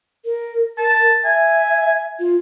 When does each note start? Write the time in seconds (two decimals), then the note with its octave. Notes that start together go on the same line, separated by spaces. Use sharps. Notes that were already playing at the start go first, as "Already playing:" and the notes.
0.25 A#4
0.78 A#4 A5
1.25 E5 G#5
2.20 F4